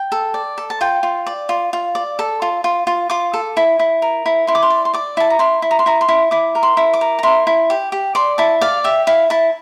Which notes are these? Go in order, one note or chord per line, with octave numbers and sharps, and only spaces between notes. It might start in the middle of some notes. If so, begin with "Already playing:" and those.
Already playing: G5
A4
D5
A4
A5
F4 G5
F4
D5
F4
F4
D5
A4
F4
F4
F4
F4 D6
A4
E4
E4
A#4
E4
E4 C6
D6
C6
D5
C6
D5 D6
E4 A5
A#5
E4 C6
E4
A#5
C6
E4 A#5
C6
E4
E4 D6
A#4
C6
E4
D6
A#4
A#5
E4 C6
E4
G4
G4
D5 C6
E4 A5
D5 F5
G4 E5
E4 F5
E4 A5